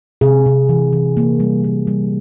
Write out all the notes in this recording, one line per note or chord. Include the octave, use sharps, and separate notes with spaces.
C3 G#4
C3
E3
E3
A#3
G3
A#3
G3